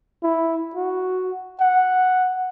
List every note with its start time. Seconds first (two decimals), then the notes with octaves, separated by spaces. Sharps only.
0.23 E4
0.75 F#4
1.60 F#5